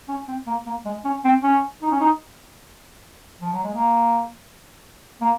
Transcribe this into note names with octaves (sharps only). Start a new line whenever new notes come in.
C#4
C4
A#3
A#3
G#3
C#4
C4
C#4
D#4
C#4
D#4
F3
F#3
G#3
A#3
A#3